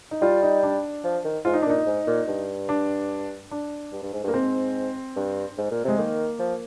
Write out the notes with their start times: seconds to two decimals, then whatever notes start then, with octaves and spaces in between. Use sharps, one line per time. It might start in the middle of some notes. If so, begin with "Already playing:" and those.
0.11 D#4
0.21 G3 F4
0.42 D#4
0.63 D4
1.04 F3
1.24 D#3
1.45 G#2 F4
1.53 D#4
1.62 D4
1.66 A#2 D#4
1.86 G#2
2.07 A#2
2.28 G2
2.69 D4
3.51 D4
3.92 G2
4.02 G2
4.13 G#2
4.24 G2
4.28 A#3
4.34 G#2 C4
5.16 G2
5.58 G#2
5.71 A#2
5.84 C3 G#3
5.98 D#3 A#3
6.39 F3